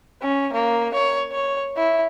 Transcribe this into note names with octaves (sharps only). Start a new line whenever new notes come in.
C#4
A#3
C#5
C#5
E4